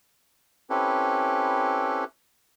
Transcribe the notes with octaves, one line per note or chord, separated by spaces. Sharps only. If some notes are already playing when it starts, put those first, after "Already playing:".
C4 C#4 E4 G4 A4 B4